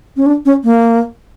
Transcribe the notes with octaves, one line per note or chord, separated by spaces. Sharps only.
C#4
D4
C#4
A#3